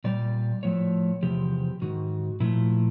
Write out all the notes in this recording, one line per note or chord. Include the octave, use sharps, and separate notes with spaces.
A#2 G3 D5
A2 F3 A3 C#5
E2 C3 F3 G4
G#2 D#3 F#4
A#2 F3 A3 E4